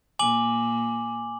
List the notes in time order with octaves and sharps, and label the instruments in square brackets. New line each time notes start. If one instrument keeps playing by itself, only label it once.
[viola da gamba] A#2 [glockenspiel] G#5 D6 F#7